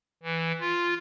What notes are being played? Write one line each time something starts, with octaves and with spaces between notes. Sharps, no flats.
E3
F4